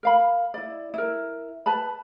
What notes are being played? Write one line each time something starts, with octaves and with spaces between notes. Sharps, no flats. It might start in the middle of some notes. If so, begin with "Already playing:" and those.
A#4 F5 B5
E4 D5
E4 A#4
B4 A5 B5